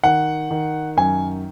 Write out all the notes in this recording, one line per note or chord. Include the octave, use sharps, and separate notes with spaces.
D#3 F#5
D#3
F#2 G#5